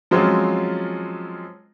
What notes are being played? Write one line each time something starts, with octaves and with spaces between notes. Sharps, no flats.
F3 F#3 G#3 C4 C#4 F4